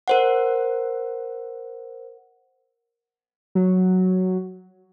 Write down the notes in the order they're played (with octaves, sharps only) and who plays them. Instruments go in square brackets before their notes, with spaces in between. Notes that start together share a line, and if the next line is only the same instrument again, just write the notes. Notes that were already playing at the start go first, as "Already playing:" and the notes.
[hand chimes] A#4 C5 F#5
[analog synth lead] F#3